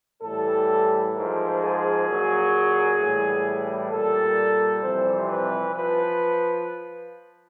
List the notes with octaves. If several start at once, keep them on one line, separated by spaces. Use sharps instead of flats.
A2 E3 G3 A4
G#2 F3 A#4
G#4
A#2 F#3
A2 E3 G3
A#2 G3 A4
F2 C3 E3 G3 C5
B4
F3 B4